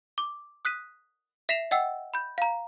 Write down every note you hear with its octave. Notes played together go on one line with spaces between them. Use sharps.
D6
D#6 F#6 B6 D#7
E5 B6 C7 E7 F7
D#5 F#5 G5 E6
B5 G6
F5 A#5